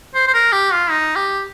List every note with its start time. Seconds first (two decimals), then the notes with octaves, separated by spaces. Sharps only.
0.15 C5
0.27 C5
0.34 A#4
0.52 G4
0.72 F4
0.90 D#4
1.16 G4